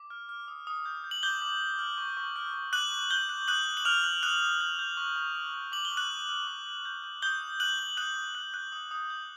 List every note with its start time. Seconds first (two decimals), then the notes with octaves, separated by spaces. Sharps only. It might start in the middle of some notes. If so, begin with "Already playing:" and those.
Already playing: D6
0.10 F6
0.29 F6
0.48 D#6
0.67 D#6
0.85 G6
1.04 G6
1.11 F#7
1.23 D6 G6 G7
1.41 D6
1.60 F6
1.79 F6
1.98 C#6
2.17 C#6
2.36 F6
2.54 F6
2.73 D6 F#6 F#7
2.92 D6
3.10 F#6 G6 G7
3.29 F#6
3.48 D#6 F#6 F#7
3.67 D#6
3.77 F#7
3.85 F6 F#6 F7
4.04 F#6
4.23 D#6 F#6 F#7
4.42 D#6
4.61 G6
4.79 G6
4.97 C#6
5.16 C#6
5.35 F6
5.54 F6
5.72 D6 F#7
5.85 G7
5.91 D6
5.97 F#6 F#7
6.10 F6
6.29 F6
6.47 D6
6.67 D6
6.85 G6
7.04 G6
7.22 D#6 G6 G7
7.41 D#6
7.60 F#6 F#7
7.79 F#6
7.97 D#6 F#6 F#7
8.16 D#6
8.35 F#6
8.54 F#6
8.72 D#6
8.91 D#6
9.10 G6